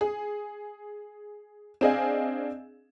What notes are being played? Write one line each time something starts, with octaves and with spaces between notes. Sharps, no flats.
G#4
C4 D4 G#4 D#5 F5 G#5